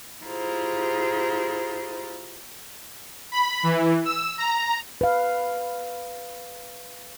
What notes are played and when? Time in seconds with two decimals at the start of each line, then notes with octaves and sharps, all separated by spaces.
0.23 E4 F4 G4 G#4 C5 A#5
3.32 B5
3.63 E3
4.05 E6
4.38 A#5
5.01 B4 F5